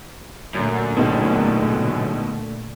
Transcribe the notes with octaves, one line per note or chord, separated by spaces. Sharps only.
F#2 A#2 D3 A3
C#2 G#2 B2